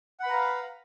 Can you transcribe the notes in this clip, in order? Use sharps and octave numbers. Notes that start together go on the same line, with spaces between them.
B4 F5 F#5 A#5 B5